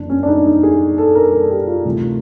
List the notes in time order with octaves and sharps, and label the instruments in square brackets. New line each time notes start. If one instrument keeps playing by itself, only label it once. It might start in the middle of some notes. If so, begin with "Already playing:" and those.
Already playing: [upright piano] F#1 E2 C#3 D4
C#4
D4
D#4
D#4
G#4
A4
A#4
A4
G4
F4
D2 C3 E3